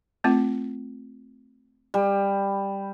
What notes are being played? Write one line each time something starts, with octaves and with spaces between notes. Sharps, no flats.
A3 C4 F4
G3